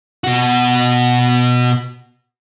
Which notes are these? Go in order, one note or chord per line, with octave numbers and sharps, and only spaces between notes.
B2 F#4